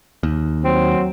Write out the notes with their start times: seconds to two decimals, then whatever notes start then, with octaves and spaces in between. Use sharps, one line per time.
0.23 D#2
0.65 F#3 C4